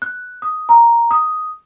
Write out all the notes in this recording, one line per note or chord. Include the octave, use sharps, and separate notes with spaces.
F#6
D#6
A#5
D#6